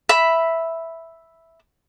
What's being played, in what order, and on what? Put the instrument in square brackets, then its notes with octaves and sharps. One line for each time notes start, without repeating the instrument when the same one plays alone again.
[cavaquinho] E5 B5